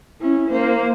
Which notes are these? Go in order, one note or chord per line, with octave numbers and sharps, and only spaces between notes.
C#4 E4
A#3 C5